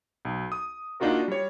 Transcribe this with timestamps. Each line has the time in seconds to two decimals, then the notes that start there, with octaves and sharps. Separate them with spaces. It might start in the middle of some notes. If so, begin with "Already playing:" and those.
0.25 B1
0.52 D#6
1.00 A#3 D4 D#4 F4 F#4 A#4
1.28 G3 C#5